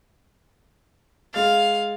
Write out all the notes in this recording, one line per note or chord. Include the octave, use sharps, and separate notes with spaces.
G#3 F5 A6